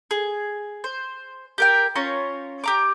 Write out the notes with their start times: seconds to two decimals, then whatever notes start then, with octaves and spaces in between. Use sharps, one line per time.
0.11 G#4
0.84 C5
1.58 G4 A#4 G5
1.95 C#4 F4 C#5 A#5
2.64 G4 A#5 D6